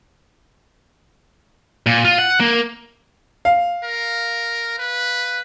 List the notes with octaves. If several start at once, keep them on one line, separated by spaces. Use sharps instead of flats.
A#2
F4
F#5
A#3
F5
A#4
B4